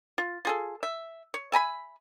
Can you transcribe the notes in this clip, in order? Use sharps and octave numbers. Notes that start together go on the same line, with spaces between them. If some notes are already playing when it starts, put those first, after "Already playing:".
F4
F4 G#4 A4
E5
C#5
E5 G#5 A#5 B5